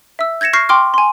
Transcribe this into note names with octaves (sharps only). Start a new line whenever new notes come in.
E5 E6
G6 G#6 A#6 C#7 E7
C#6 F6 G6 A#6 C7
G5 C6 D6 F6
G#5 C6